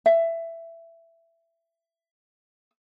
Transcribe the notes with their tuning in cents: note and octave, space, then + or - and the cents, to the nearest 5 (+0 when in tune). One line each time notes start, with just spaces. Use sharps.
E5 +15